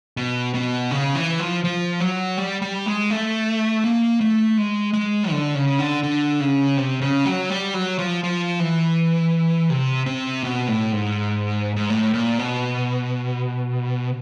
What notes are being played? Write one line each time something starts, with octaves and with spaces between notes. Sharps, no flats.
B2
B2
C#3
E3
F3
F3
F#3
G3
G3
G#3
A3
A#3
A3
G#3
G#3
D3
C#3
D3
D3
C#3
C3
C#3
F#3
G3
F#3
F3
F3
E3
C3
C3
B2
A2
G#2
G#2
A2
A#2
B2